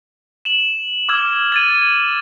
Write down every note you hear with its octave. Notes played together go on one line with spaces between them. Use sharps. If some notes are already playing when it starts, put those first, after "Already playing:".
E7 F#7
D6 E6 F6 G#6
G#6 A6 D#7